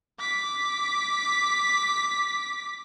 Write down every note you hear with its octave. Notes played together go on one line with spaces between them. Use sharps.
D6 B6